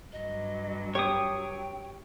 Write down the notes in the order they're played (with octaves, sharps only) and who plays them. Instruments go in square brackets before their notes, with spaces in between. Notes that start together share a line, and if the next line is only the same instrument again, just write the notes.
[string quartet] G2 F#3 [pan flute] D#5
[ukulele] G4 [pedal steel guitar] C#5 D#6 [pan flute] G5